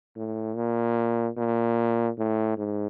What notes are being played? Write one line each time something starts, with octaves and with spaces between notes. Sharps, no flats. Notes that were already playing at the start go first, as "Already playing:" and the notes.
A2
A#2
A#2
A2
G#2